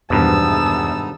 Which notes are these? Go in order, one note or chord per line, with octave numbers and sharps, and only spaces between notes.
G#1 E2 G2 B2 B3 D#4 A5 E6